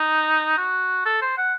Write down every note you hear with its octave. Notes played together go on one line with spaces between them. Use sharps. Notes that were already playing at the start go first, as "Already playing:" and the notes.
Already playing: D#4
F#4
A4
C5
F#5